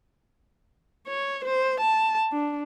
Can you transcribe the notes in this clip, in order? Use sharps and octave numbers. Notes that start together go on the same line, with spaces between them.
C#5
C5
A5
D4